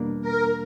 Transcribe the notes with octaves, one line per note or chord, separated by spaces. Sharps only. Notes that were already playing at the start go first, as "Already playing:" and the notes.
Already playing: E2 B2 G3 A#3 D4
A#4